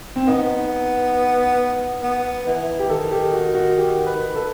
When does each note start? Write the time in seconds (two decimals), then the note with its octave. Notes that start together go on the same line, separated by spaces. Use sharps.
0.16 C4
0.27 B3 D#4
2.03 B3
2.47 E3
2.79 G4
2.89 D#3 A4
3.11 G4
3.33 F#4
3.55 F#4
3.78 G4
4.07 B4
4.35 A4